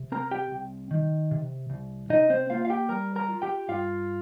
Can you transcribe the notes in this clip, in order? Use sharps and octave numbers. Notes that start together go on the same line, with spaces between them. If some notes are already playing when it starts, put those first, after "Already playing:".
Already playing: C3
C4 A#4 A#5
G4 G5
C2
D#3
C3
C2
C3 D#4 D#5
C4 C5
A#3 F4 F5
F5
G4 G5
G3 A#4 A#5
A#4 A#5
F4
G4 G5
G2 F4 F5